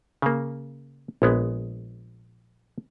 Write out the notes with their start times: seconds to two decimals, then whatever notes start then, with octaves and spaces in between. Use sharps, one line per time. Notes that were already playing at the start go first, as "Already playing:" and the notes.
0.22 C#3 A#3
1.22 A#1 G#3 B3